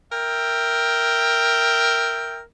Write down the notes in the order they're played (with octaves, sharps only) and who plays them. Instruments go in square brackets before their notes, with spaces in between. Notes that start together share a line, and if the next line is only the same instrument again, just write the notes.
[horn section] A#4 E5 G5